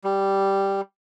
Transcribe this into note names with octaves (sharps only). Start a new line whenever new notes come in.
G3